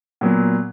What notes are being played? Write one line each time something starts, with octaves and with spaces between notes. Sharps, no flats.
A#2 F#3 B3